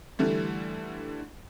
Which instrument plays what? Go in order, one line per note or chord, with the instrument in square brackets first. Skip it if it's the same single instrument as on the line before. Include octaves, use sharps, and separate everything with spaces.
[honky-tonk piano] D3 E3 G3 A3